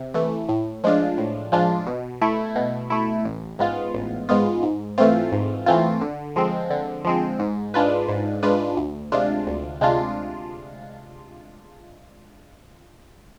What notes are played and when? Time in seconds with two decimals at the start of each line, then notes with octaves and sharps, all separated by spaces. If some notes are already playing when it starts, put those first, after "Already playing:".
Already playing: C3
0.14 E3 A3
0.49 A2
0.84 F3 G#3 D4 F4
1.18 A2
1.52 F3 G#3 D4 F4
1.87 B2
2.22 A3 E4
2.56 B2
2.90 A3 E4
3.25 A1
3.59 G#2 G#3 B3 F4
3.94 A1
4.29 G#2 G#3 B3 F4
4.63 G#2
4.98 E3 A3 C4 F4
5.32 G#2
5.66 E3 A3 C4 F4
6.01 D3
6.36 F3 G#3 C4
6.70 D3
7.05 F3 G#3 C4
7.39 G#2
7.74 G#3 D4 F4 B4
8.09 G#2
8.43 G#3 D4 F4 B4
8.77 D2
9.12 C3 G#3 D4 F4
9.47 D2
9.81 C3 G#3 D4 F4